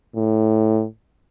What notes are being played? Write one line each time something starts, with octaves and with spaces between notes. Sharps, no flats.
A2